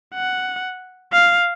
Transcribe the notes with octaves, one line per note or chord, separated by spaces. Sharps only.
F#5
F5